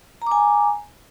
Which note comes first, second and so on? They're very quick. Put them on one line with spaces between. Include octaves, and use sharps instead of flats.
A#5 D6 G#5